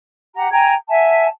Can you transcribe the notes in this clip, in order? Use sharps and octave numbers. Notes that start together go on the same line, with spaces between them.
G4 F#5 A#5
G5 G#5 A#5 G#6
E5 F#5 G#5 A5